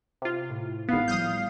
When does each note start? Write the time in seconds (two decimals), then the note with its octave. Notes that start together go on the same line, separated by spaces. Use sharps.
0.22 C3 F4
0.50 A2
0.89 G#1 B3 F5
1.08 F3 G3 D#6 F6 G6